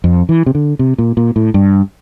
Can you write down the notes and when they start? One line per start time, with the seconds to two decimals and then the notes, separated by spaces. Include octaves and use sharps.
0.04 F2
0.29 E3
0.46 C3
0.55 D3
0.79 C3
0.98 A#2
1.17 A#2
1.36 A2
1.54 G2